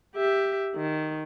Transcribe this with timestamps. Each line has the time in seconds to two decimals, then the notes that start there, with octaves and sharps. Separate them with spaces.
0.16 G4 E5
0.76 D#3